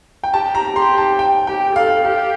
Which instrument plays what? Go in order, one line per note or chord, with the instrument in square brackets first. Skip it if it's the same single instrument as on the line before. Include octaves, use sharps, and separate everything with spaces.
[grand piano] G5
[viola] G4 [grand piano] A5
[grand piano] A#5
[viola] G4 [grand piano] C6
[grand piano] A5
G5
[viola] G4 [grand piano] G5
[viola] A4 [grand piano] F5
[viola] G4 [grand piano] F5